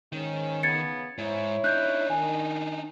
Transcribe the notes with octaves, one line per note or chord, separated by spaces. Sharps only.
G#2 D#3 C#4
C#3 B3 G#6 A6 C#7
G#2 E4 C#5
D4 D#4 F#6 G6
D#3 G#5